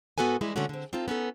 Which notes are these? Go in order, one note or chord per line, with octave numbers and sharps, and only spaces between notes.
G#2 B3 F#4 A4 B4 G#5
E3 G3 G#3 E4 G#4
D3 G#3 A3 C#4 F#4
D3 C4
C4 D#4 F4 A4
B3 C#4 D#4 A4